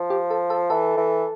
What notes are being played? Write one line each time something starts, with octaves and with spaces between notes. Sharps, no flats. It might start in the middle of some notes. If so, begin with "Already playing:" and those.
Already playing: F3
G4
A4
A4
E3 A4
E3